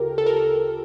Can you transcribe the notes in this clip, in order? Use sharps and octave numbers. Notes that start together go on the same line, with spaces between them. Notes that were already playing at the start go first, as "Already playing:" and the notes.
Already playing: D2 C#3 F4 G4 A4 A#4
A4
A#4
A4